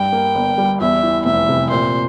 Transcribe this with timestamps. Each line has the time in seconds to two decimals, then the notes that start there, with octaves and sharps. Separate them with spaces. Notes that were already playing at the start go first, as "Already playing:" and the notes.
Already playing: G2 G5
0.12 A#3
0.35 G1
0.58 G3
0.80 E2 E5
1.03 E3
1.26 F1 E5
1.49 C3
1.71 A#2 C5